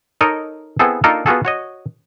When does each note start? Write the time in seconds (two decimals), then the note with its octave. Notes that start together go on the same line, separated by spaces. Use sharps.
0.21 D#4 A4 A#4 C#5 D#5
0.79 B3 C4 E4 G#4 A4
1.04 A#3 D4 D#4 F4 A4 A#4
1.26 B3 F4 F#4 G#4 A4
1.45 F#4 C#5 D#5